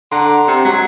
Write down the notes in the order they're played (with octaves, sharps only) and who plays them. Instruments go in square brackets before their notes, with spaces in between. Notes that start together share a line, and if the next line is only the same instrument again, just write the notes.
[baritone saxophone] D3 [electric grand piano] F#5 A#5 C6
[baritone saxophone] C3
[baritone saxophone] F#3 [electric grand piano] G#3